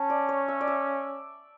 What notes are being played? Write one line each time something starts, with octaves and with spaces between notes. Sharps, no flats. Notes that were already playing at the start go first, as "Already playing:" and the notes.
Already playing: C#4 A5
D5
C#5
E5
D5
E5